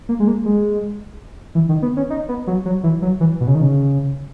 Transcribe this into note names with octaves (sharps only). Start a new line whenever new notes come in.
A#3
G#3
A#3
G#3
E3
D#3
B3
C#4
D#4
B3
F#3
F#3
E3
F#3
E3
B2
C#3
D#3
C#3